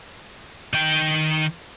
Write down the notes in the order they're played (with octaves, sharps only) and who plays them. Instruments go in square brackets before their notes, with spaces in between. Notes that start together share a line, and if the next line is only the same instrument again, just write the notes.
[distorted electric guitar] D#3 G5